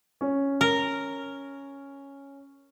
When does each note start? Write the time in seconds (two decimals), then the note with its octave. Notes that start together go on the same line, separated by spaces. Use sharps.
0.21 C#4
0.61 A#4